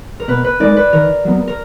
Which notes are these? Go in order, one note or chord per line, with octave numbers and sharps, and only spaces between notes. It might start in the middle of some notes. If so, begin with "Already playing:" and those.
A#4
B2 B4
B4
G#3 D#4 A#4 D5
B4
D#3 A#4
F#3 B3
A#4